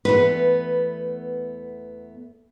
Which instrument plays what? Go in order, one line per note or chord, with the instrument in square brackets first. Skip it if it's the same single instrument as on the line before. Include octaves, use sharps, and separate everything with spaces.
[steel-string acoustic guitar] E2 A3 B3 [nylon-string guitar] B4